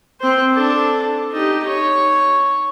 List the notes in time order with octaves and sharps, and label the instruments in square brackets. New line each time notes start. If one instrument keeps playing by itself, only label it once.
[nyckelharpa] C4 C5
D4 A4
D#4 G4
C#5